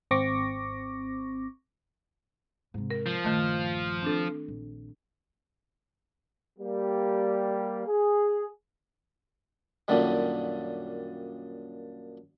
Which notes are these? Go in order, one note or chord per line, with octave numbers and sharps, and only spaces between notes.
G#1 C4 C#6 D6 A#6
G#2 C3
A#4
F3
A#1 G2 D#3 A3
C4 D4 A4
A#1
G3 A#3
G#4
F#2 A#2 D3 D#3 G3